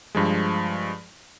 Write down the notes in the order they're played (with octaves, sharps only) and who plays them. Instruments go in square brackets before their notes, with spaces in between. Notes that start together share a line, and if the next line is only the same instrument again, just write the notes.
[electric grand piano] G2 F3 G#3